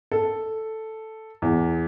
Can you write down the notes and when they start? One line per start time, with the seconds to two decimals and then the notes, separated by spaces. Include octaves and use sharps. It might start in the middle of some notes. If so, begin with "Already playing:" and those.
0.12 A4
1.42 E2